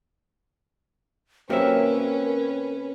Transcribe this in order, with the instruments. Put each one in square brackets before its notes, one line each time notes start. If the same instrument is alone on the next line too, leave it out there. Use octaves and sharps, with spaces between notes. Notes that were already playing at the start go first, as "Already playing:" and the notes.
[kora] C3 F#3 E5 [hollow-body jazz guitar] A#3 G4 [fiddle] C#4 B4 [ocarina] A#4